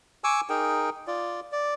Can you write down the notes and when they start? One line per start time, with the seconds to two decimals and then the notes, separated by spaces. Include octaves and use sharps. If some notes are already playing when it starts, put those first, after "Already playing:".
0.24 G#5 C#6 D6 E6
0.50 D#4 G#4 A#4 G5
1.07 F4 D5
1.52 D5